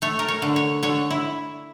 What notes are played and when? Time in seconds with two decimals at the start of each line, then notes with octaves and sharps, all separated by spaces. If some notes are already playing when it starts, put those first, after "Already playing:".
0.02 A3 C#5
0.19 A#4
0.28 C#5
0.42 D3
0.56 C#5
0.83 D3 C#5
1.11 E4